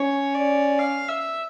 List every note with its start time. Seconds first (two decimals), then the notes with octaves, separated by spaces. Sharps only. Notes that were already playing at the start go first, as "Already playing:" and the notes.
Already playing: C#4 C#5
0.34 D5
0.79 F5
1.08 E5